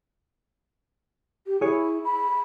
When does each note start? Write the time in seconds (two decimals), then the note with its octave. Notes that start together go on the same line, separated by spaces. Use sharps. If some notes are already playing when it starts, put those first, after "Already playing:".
1.47 G4
1.61 E4 G#4 C#5
2.04 B5